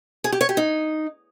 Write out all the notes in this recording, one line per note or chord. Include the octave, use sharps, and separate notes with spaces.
G#4
G4
C#5
G4
D#4